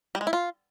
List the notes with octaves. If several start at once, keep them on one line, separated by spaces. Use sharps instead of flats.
G3
G#3
E4
F4